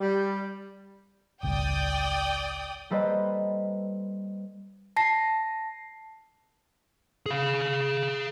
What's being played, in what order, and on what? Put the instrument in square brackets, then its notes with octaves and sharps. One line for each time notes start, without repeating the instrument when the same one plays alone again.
[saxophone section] G3
[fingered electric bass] G#1 C#2 G2 [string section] D5 G5 D#6
[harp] G3 A#3 A4 B4 C5 D#5
[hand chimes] A5 A#6 C7
[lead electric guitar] G#4 F5